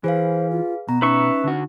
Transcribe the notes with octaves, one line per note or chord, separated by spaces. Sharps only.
E3 G#4 B4 C5 F5
F4
B2 B3 A#5
C#4 D#4 B4 E5 C#6
D3 F#4